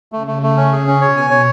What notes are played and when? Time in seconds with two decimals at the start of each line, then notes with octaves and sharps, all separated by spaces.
0.12 C#3 A3
0.27 A3
0.43 A3
0.57 C#4
0.73 G#4
0.87 C#4
1.01 B2 C#5
1.17 G#5
1.31 C#5